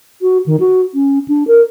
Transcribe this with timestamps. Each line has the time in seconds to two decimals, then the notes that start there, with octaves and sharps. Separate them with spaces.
0.22 F#4
0.46 D#3
0.60 F#4
0.94 C#4
1.28 D4
1.48 A#4